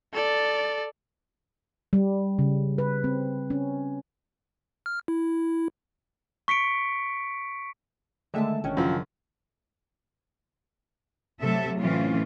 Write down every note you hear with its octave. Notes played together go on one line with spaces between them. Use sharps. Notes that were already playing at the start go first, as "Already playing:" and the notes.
A4 D5
G3
C#3
B4
C4
C#4
F6
E4
C#6 B6 C#7 D7
D3 D#3 G#3 A3 E5 A5
A1 D#3 C#4 D4
F#2 C#3 F3
C3 F#3 A3 A4 E5
A2 E3 A3 C4 C#4 F4